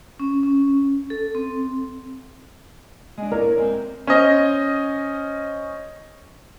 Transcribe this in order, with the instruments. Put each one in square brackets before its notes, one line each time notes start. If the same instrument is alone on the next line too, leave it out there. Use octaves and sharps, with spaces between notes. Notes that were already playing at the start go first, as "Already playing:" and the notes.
[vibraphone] C#4
C#4
A4
C4
[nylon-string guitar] G#3 D4
[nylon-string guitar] E4 C#5 D5 [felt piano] A#4
[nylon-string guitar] G#3 C4
[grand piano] C#4 C5 D#5